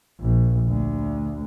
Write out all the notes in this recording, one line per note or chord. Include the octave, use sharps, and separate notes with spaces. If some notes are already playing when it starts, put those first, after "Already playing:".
A#1
D2